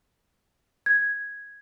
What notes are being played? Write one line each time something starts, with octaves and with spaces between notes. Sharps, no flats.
G#6